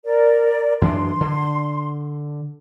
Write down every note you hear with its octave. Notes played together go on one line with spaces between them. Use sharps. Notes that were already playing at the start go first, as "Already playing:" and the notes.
A#4 D5
F#2 E3 D4 C6
D3